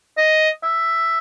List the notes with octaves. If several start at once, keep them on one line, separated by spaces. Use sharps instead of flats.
D#5
E5